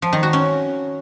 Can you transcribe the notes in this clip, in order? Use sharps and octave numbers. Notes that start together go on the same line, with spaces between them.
F3
D#3
F#4
C#4